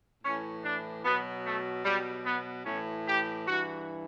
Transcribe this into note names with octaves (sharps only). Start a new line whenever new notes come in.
A2 E3 C#4
D4
B2 F#3 B3
A3
B2 F#3 G3
B3
A2 E3 C#4
G4
G2 E3 F#4